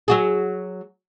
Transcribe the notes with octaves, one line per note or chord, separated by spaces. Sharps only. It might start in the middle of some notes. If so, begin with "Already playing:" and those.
F#3 F#4 G#4